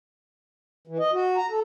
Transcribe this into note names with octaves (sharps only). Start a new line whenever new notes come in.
E3
D#5
F#4
A#5
A4